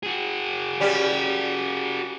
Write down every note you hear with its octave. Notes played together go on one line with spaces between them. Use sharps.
F#4 G#4
G3 C#4